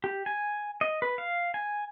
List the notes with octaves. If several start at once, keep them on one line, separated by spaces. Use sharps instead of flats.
G4
G#5
D#5
B4
F5
G#5